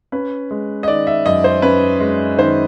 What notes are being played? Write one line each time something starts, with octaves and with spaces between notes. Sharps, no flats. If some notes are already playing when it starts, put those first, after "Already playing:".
C#4 B4
G#3
D#5
D#3 D5
E5
F#2 D#5
C5
C#4 B4
G#3
D#3 C5